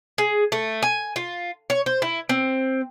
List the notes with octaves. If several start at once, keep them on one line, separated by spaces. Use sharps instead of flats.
G#4
A3
G#5
F4
C#5
C5
E4
C4